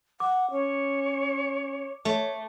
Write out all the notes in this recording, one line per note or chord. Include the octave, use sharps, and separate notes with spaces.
F#5 D6
C#4 C#5
A3 C#5